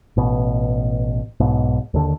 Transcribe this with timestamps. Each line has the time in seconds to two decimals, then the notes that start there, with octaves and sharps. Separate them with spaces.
0.17 A1 B2
1.40 B1 G#2 B2
1.94 D#2 D3